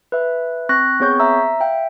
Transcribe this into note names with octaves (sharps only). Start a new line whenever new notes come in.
B4 E5
C4 C#6 F#6 A#6
B3 C4 G#4 C#5 C#6 G6
E5 A#5 E6
E5 F5 G5